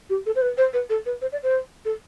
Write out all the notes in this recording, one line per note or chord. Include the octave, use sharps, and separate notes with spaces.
G4
A4
C5
B4
C5
B4
A4
B4
C5
D5
C5
A4